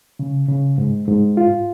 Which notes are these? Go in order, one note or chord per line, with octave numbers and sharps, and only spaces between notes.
C#3
C#3
G#2
G#2
F4